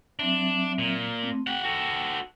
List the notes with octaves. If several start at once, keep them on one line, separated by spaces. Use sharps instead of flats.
F#3 C4 D4 E5
A#2
A3 C4
G4 F#5 G5
F#4 A4